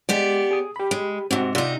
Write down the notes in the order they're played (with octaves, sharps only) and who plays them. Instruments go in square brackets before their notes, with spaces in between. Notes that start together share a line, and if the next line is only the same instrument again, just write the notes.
[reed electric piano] G#3 [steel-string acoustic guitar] B3 G4 D5
[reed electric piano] G#4 D#6
G4 B5
[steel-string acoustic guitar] G#3
[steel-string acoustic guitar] G#2 C3 [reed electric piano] C4 F#4
[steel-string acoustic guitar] C3 D#4 [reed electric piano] F4 D5 F#5